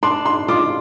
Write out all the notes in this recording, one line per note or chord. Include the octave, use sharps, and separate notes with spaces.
D4 C6
C6
F4 D6